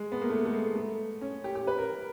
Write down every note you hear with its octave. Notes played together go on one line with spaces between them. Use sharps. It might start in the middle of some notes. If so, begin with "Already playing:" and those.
Already playing: G#3
B3
A#3
A3
A3
G#3
A3
C#4
G4
G4
B4
A#4